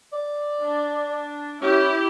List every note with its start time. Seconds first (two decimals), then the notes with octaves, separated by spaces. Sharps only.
0.13 D5
0.61 D4
1.61 C#4 E4 G4